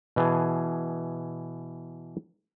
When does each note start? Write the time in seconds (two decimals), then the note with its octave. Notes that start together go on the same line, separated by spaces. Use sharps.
0.16 B2 E3 G#4 A5